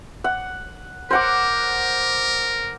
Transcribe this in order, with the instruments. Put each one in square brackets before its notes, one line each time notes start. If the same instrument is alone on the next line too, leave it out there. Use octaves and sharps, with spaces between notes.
[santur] F#5
[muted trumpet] A#4 [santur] C5 F#5 D6